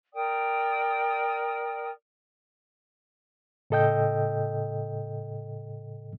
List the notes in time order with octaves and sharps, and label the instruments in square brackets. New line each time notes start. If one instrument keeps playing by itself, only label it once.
[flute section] A#4 D5 G5 D#6
[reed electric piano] A2 C#3 A4 D#5 G5 G6